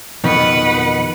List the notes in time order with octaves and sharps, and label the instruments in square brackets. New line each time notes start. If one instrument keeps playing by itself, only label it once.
[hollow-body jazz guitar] F2 B2 D#3 [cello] B4 F#5